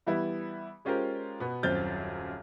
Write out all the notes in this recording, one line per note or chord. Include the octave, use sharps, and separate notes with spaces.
E3 G3 B3 E4
G#3 C#4 F4 G4 A#4 C5
B2 B3
D#1 F#2 C4 F6 G6 A6